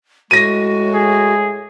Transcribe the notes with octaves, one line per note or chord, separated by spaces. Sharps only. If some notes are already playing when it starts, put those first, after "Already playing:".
A2 G#3 F#4 A#6 D#7
G#4